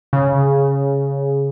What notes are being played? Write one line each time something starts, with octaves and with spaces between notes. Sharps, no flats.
C#3